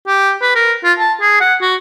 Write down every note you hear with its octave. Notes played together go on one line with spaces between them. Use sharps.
G4
B4
A#4
F4
A5
G#4
F#5
F#4